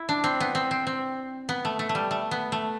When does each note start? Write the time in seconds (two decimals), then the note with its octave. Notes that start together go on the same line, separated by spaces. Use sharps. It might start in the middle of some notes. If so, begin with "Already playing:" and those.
Already playing: E4
0.09 D4
0.24 C4
0.40 B3
0.55 C4
0.71 C4
0.87 C4
1.49 B3
1.65 A3
1.79 A3
1.89 A3
1.95 G3
2.11 A3
2.31 B3
2.52 A3